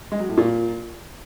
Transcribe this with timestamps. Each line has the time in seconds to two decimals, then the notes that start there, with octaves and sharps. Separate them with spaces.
0.12 G#3
0.20 F#3
0.29 A2
0.37 A#2